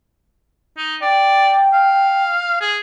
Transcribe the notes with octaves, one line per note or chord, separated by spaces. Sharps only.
D#4
D5 G5
F5
G#4